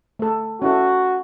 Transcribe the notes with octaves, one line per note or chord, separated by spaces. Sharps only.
A3 A4
C#4 E4 F#4 A4